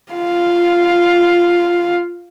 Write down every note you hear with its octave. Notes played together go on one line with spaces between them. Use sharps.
F4 F5